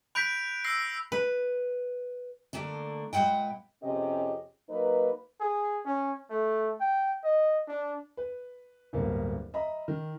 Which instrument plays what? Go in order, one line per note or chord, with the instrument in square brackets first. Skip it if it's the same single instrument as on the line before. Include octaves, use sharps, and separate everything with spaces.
[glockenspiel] B5 G6 B6 [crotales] F#6 D7 F7
[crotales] E6 A#6 C7
[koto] B4
[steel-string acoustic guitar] D3 A3 A#3 D4
A#2 G#3 B4 F#5 G5
[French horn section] F2 C3 C#4 G4 G#4 D#5
F#3 A#3 D#4 B4
[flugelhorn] G#4
C#4
A3
G5
D#5
D4
[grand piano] B4
D1 G2 A#3 B3 A#4
D#5 E5 A#5 B5
D#3